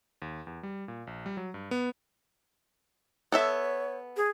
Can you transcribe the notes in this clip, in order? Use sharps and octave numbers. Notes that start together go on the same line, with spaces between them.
D#2
E2
G3
A#2
A#1
G3
F#3
G2
B3
B3 A4 C#5 E5
G#4